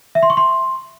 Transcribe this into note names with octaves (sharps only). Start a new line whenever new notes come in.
E5
C6
C#6
C6